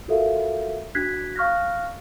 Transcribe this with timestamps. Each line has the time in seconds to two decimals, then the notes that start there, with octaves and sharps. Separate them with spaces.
0.08 F4 F#4 A4 A#4 E5 F5
0.95 D4 F#4 F#6 G#6 B6 C7
1.36 F5 C#6 F6 F#6 A#6